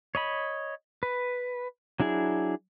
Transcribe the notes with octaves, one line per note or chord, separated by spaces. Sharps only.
C#5 D#5 B5
B4
F#3 D4 E4 G#4